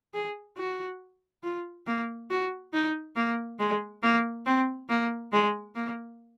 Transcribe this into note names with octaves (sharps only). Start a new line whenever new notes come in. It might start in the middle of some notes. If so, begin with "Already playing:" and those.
G#4
F#4
F4
A#3
F#4
D#4
A#3
G#3
A#3
C4
A#3
G#3
A#3